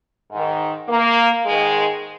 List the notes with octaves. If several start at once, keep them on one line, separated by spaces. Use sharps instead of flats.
G#2 D#3
A#3
G#2 D#3 G#3